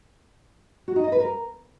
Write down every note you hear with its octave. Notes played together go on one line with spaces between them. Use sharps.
F#4
D#4
D#5
B4
A#4